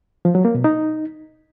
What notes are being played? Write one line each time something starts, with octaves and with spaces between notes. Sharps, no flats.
F3
F#3
A#3
B2
D#4